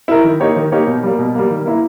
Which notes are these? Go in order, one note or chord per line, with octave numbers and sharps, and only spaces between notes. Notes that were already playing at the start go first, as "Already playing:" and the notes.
E4 A#4
D#3
A#3 D#4 G4 C#5
D#3
A#3 D#4 G4 C#5
B2
G3 A#3
B2
G3 A#3
D#3
A#3 E4 A#4